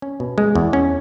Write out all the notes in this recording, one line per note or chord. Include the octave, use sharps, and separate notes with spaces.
C#4
B2
G#3
E2
C#4